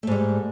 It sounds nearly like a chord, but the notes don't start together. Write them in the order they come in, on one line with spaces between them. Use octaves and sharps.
A3 G#2 G3